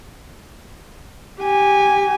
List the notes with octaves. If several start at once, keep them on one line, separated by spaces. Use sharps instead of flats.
G4 G#5